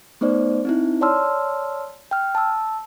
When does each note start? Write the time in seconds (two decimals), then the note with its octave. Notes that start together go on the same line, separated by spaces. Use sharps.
0.21 A3 B3 D#4 C5 D5
0.65 C4 D#4 E4
1.01 C#5 D5 A5 C6 E6 F6
2.11 G5 F6
2.35 A5 E6